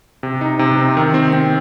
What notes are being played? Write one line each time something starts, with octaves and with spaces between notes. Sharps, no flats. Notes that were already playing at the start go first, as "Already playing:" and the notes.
C3
D#4
C3
C4
D#3
C4
C4